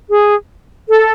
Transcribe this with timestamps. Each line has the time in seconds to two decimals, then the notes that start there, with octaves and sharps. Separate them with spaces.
0.09 G#4
0.88 A4